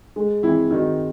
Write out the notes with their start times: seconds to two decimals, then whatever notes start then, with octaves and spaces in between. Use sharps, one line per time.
0.16 G#3
0.43 E3 C4 E4
0.71 D#3 D#4 F#4